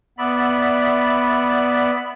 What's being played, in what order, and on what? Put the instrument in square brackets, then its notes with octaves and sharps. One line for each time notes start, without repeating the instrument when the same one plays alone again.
[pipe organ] B3 D5 E5 B5